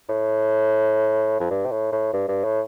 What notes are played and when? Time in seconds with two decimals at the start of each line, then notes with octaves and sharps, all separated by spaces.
0.09 A2
1.40 F2
1.51 G2
1.65 C3
1.71 A2
1.92 A2
2.14 G2
2.28 G2
2.44 A2